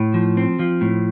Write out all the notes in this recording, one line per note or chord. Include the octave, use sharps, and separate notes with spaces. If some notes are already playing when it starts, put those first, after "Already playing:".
Already playing: A2
F3
C4
F3
A2